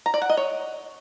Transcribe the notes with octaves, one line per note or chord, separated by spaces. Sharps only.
A#5
D5
F#5
D#5
C#5